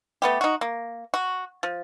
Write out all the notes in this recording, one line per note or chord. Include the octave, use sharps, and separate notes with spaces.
A3 B3 G4
D#4 F#4
A#3
F#4
F3